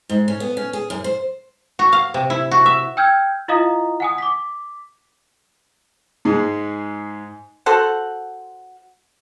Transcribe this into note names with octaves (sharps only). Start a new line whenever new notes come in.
G#2
C#4
B3
C#4
G#4
F#2
C5
F#4
F5
C3
E4
F#4
E5
G5 E6 F6 G6 G#6
E4 F4 D#5 F5 A#5 D#6
F#5 G#5 D#6
D6 B6
G#2 G#3
F#4 A4 C5 F#5